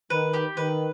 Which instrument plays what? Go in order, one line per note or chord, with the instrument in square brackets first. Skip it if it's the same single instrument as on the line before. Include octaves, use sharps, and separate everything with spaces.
[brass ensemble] D#3 [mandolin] B4
[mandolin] G4
[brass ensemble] D#3 [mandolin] B4